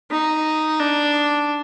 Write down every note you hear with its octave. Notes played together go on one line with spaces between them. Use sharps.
D#4
D4